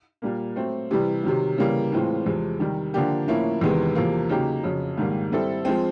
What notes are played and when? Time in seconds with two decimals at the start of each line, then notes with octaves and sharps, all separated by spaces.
0.22 A#2 G3 A#3
0.56 F#3 A3 C4
0.91 C3 E3 G3
1.23 C3 D#3 F#3
1.58 C#3 E3 G3 A#3
1.92 A2 E3 G#3 C4 F4
2.26 E2 C3 F3 G#3
2.59 C3 D#3 G3
2.94 D3 F3 A#3 D4 G4
3.27 A2 F3 A#3 C#4 E4
3.61 E2 C3 D#3 G#3 B3
3.95 E2 C3 F3 A#3
4.29 C#3 F#3 A#3 D#4 G4
4.63 F2 C#3 F#3
4.97 G#2 D#3 G3 A#3
5.32 G3 C4 E4 A4
5.65 F3 G#3 C4